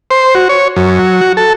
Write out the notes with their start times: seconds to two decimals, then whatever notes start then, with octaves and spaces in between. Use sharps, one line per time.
0.11 C5
0.35 F#4
0.49 C#5
0.76 F#2
0.99 F#3
1.21 F#4
1.37 A4